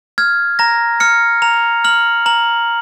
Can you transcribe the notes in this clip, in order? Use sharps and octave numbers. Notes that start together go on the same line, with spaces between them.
F6 G#6
A#5 A#6
F6 C#7
A#5 F7
F6 F#7
A#5 F#7